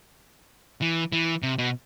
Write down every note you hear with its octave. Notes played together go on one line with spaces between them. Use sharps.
E3
E3
C3
B2